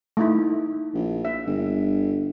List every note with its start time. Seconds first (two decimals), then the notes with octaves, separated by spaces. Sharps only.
0.17 A3 D#4 E4
0.94 A#1
1.25 E5
1.46 G1